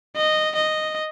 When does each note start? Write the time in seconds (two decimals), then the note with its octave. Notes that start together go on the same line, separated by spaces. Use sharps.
0.16 D#5
0.56 D#5